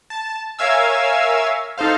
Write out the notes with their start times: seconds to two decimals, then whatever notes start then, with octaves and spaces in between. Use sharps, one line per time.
0.10 A5
0.59 A#4 C#5 E5 F5 G#5 E6
1.78 D#4 A4 C5 F5